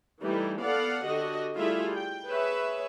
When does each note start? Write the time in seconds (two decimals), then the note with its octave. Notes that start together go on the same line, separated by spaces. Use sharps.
0.21 E3 G3 A3 D#4 E4
0.61 B3 A4 D5 F5 F#5
1.05 D3 F#4 G4 D#5
1.56 G3 A3 E4 F4 G#4 E5
1.94 G5
2.27 G#4 B4 C#5 E5